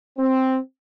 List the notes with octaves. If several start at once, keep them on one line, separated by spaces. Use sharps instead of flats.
C4